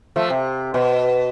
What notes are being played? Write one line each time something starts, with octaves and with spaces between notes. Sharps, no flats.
F3 A3
C3
B2